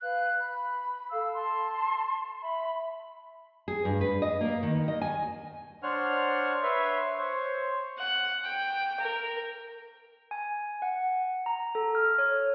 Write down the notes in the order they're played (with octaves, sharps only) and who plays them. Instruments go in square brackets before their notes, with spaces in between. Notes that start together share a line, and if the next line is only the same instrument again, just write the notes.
[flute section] B4 F5 F#6
B5
A4 F5 E6
A5 C6
E5 B5
[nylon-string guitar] G#4
G2
B4
D#5
A#3
D#3
D#5
G#5
[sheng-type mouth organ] D4 C5 C#5 F#5 F6
B4 C#5 E5 C6
C5 C#5
[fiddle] F#5
G5
A#4
[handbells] G#5
F#5
A#5
A4
F6
C#5